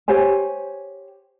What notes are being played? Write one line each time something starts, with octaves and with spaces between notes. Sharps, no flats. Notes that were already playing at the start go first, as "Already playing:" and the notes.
G4 C5 C#5 G#5